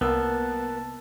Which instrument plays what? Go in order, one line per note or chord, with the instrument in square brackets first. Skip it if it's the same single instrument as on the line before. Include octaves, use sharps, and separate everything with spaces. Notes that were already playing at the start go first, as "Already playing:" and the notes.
[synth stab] C2 [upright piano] A#3 E6 [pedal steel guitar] B3 [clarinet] A5